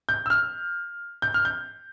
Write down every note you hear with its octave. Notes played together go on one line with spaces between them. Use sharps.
G6
E6
F6
G6
F6
G6